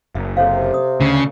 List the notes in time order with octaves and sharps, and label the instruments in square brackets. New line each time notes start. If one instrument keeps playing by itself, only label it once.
[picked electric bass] F#1 [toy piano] E5
[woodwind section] C3 [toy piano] A4 C#5 F5
[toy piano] D#6
[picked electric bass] D2 [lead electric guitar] C#3